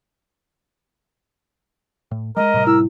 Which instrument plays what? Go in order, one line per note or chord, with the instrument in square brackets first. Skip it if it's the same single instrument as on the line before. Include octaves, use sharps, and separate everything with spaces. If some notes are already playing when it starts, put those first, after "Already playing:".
[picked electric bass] A2
[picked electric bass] G3 G#3 [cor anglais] A#4 [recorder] D#5
[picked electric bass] A2 C3 G3
[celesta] E4 [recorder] E6